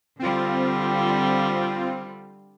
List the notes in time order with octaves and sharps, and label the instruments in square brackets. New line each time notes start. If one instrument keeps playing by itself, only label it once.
[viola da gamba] D3 G3 [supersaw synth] C4 F4